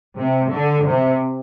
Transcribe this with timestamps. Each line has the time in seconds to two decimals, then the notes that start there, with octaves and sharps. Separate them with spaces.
0.16 C3
0.51 D3
0.86 C3